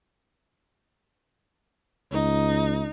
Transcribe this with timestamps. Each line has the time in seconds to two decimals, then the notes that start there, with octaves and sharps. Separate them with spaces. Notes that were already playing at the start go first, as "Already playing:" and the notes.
2.12 C#2 D#4